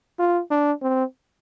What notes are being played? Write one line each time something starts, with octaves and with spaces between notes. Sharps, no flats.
F4
D4
C4